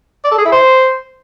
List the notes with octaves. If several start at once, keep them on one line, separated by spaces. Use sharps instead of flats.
D5
A4
G#4
E4
C5